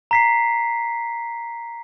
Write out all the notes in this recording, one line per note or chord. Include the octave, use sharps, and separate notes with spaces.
A#5 B6 C7